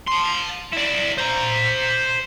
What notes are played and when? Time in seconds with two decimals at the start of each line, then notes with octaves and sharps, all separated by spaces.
0.07 A5 C6
0.72 E4 D5
1.18 C5 A#5